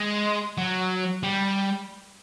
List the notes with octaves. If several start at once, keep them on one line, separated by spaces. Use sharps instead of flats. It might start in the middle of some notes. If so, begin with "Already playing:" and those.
Already playing: G#3
F#3
G3